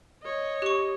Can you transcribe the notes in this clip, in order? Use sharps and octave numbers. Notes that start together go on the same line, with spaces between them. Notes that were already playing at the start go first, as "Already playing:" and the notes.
C#5 D#5
G4 C#6